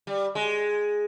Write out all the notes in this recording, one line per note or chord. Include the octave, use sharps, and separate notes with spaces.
G3
G#3